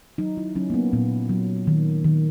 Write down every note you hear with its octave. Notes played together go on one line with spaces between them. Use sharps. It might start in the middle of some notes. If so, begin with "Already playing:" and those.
F#3 D#4
E4
F#3 C#4
A#3
B3
A#2 B3
F#3
D#3
D#3